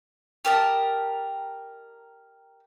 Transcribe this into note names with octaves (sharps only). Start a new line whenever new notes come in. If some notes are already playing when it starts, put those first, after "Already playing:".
G4 A#4 D#5 A5